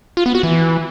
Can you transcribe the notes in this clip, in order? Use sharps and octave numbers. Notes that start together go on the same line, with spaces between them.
F4
B3
F#4
E3